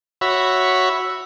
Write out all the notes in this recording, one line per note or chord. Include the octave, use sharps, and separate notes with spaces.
F#4 C#5 E5 B5